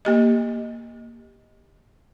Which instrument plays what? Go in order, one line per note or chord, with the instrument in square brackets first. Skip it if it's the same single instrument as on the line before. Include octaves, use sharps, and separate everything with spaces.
[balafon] A#3 G4 D#5